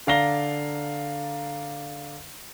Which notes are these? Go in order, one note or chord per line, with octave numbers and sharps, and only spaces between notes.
D3 D5 F5 A#5 A#6 G7